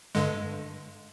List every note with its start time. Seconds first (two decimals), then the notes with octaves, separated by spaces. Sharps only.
0.15 G2 D3 G#3